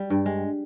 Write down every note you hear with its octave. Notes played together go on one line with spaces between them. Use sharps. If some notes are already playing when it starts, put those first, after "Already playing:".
Already playing: G3
G2
G#3